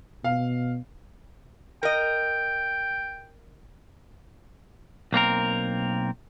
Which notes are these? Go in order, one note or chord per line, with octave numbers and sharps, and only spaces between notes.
B2 F5
A#4 D#5 G5
B1 A#3 C4 A#4